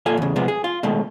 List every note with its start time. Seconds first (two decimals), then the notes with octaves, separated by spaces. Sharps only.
0.06 A#2 F4 A4 G#5
0.17 E2 C#3
0.36 C3 F3 G#3 B3
0.48 G#4
0.64 F4
0.83 B2 D#3 G#3 A3